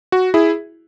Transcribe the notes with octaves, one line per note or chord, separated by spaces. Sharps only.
F#4
E4 G#4